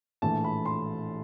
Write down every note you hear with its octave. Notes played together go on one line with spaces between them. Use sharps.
A#1 A2 E3 A5
B5
C6